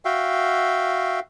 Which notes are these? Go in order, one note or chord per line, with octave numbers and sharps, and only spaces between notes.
F#4 E5 F5 G5